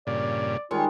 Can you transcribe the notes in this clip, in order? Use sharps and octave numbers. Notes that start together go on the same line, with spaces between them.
G2 A#2 C#3 D5
D#3 G3 G#3 F4 C#5